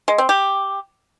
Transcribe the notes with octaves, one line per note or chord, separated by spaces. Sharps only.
G#3
C4
G4